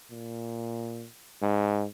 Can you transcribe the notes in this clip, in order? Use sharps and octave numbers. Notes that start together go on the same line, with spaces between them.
A#2
G#2